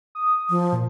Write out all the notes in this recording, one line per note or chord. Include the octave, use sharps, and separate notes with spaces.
D#6
F3
A#2